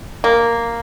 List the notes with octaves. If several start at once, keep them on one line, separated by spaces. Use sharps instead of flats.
A#3